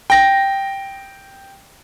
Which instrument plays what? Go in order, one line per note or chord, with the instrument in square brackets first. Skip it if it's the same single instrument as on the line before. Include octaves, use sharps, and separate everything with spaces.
[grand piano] G5 A#6